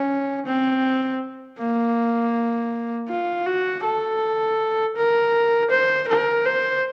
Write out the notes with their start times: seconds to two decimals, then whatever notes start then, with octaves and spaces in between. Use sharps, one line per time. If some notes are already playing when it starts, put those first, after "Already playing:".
Already playing: C#4
0.46 C4
1.59 A#3
3.09 F4
3.46 F#4
3.84 A4
4.96 A#4
5.71 C5
6.08 A#4
6.46 C5